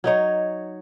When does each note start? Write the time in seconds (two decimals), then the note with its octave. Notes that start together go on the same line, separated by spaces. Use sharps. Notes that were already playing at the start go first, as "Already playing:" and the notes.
0.04 F#3 D#4 C#5